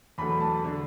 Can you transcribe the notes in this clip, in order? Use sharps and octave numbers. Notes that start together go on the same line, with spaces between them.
E2 B2 F#3 A3 B5
A5
D3 A3